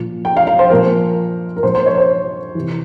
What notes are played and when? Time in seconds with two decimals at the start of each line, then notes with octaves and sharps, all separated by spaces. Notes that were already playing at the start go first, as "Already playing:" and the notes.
Already playing: A#2 F3
0.25 G5
0.37 F5
0.47 F5
0.59 C5
0.70 A#2 F3 A#4
1.57 A#4
1.63 A#2 F3 C5
1.75 C5
1.86 C#5
1.98 C5
2.55 C3 E3